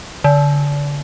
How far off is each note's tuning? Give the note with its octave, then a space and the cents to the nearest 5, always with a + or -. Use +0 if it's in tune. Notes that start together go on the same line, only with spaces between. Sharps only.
D3 -30